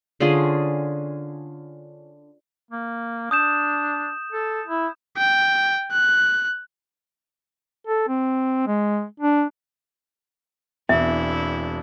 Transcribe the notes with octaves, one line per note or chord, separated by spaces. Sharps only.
D3 C#4 F4 G#4
A#3
D4 D#6 G6 E7
A4
E4
G5
F#6
A4
C4
G#3
D4
E1 E2 C4 D4 E4 E5